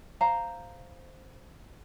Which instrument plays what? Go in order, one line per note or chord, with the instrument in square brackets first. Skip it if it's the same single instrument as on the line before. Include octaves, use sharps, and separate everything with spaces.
[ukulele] C5 F5 A#5